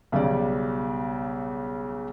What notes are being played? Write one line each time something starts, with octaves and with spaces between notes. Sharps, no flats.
B1 C#3 G3 D5